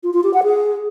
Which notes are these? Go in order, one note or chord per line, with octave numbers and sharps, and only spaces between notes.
F4
F4
G4
F#5
G#4